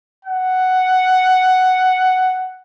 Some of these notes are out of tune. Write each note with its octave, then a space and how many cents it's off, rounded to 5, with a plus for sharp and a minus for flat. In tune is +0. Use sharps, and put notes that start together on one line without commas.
F#5 +5